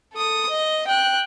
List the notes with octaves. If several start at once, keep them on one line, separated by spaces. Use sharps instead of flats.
A4 D#6
D#5
G5 F#6